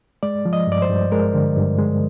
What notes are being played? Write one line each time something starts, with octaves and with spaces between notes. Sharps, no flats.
G#3 D5
F3
D#5
G2 D5
C5
G2
G#3 A#4
D3
G2
G#3